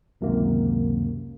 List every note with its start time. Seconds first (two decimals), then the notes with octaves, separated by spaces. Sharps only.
0.21 C#2 F#2 C3 D#3 A#3